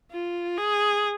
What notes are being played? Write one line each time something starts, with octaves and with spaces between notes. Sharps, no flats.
F4
G#4